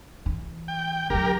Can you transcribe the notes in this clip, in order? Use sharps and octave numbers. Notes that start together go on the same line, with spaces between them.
E3
G5
D3 F#3 G4 A#4